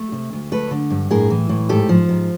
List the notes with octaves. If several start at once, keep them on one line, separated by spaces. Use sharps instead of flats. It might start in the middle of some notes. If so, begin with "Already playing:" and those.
Already playing: A3
C3
D2
A3 A4 B4
D3
G2
A2 G#4 A#4
E3
A2
G#2 G4 A4
F3
G#2